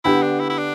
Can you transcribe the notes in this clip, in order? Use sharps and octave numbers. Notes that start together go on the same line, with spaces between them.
D3 B3 E4 G4
D4
E4
E4
D4